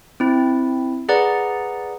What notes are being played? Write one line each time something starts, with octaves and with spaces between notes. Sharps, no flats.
C4 E4
G#4 B4 D5 F#5 A#5